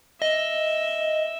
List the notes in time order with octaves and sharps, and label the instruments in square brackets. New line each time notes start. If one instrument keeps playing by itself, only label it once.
[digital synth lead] D#5 [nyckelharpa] E5